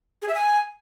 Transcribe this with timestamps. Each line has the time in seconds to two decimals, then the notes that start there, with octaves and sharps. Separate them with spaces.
0.22 G#4
0.28 E5
0.35 G#5